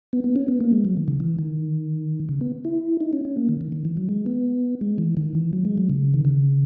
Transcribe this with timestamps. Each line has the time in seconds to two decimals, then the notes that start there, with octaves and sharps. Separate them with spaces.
0.13 B3
0.24 B3
0.36 C#4
0.48 B3
0.61 A#3
0.73 G#3
0.85 F#3
0.97 D#3
1.08 C#3
1.20 E3
1.38 D#3
2.29 C#3
2.41 B3
2.65 E4
3.01 D#4
3.13 C#4
3.25 C#4
3.37 A#3
3.49 D#3
3.61 D#3
3.72 D#3
3.85 E3
3.97 F#3
4.09 G#3
4.26 B3
4.81 G#3
4.98 E3
5.17 D#3
5.35 E3
5.53 F#3
5.65 G#3
5.78 F#3
5.90 C#3
6.14 D#3
6.25 C#3